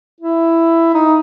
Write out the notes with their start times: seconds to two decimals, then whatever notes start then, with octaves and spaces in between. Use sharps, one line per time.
0.21 E4
0.94 D#4